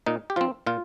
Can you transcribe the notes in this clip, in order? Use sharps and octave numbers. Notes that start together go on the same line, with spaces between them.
A#2 D#4
G4
F3 C4 F4
A#2 F4